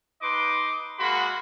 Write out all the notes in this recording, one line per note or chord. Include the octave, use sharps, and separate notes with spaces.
D#4 B4 D#5 C6 D6
G#3 A#3 F#4 B5 C6